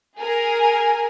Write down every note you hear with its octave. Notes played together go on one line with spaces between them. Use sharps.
G#4 A#4 G#5